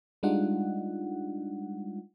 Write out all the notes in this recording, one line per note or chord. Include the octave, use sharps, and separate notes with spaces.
G3 G#3 D4 D#4 F4 F#5